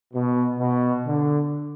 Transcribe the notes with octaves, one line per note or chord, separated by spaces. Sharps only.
B2
B2
D3